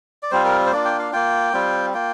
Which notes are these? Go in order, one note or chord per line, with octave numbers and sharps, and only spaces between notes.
D5
G3 C4 F4 C5
A#4
C5
A#3 D4 F4 D5
G5
F5
A#3 F4 G5
G3 C4 F4
A#3 F4 G5